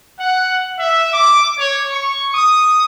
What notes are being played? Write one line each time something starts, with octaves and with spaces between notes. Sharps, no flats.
F#5
E5
D6
C#5
C#6
D#6